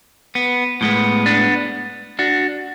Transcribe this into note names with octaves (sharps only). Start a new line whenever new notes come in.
B3
A2 G#3 B3
B3 D4
D4 F#4